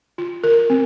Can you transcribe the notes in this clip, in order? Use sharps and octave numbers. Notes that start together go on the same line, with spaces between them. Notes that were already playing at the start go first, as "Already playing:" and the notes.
F4
A#4
C4